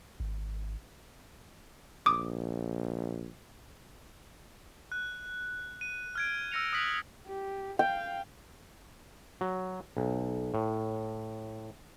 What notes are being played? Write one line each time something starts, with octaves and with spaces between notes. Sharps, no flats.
G#1
A#1 D6 D#6
F#6
D#7
F6 G#6 D7
E6 F6 A#6 C#7 F7
D#6 F6 F#6 B6 F#7
G4
F5 G5
F#3
B1
A2